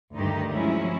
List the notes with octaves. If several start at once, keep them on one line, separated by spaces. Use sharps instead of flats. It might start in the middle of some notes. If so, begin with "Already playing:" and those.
D2 G2 D#3 D#4 G4
F3 F#3 G#3 C#4 E4